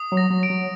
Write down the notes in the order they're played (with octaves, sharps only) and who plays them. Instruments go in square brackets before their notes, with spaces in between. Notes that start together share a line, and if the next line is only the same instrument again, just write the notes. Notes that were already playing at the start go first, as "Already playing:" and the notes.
Already playing: [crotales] D#6
[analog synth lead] F#3
[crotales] A#6
[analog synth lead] F#3
[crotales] D7
[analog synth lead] F#3